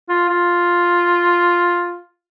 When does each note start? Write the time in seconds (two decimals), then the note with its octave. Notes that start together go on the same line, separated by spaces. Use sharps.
0.09 F4
0.29 F4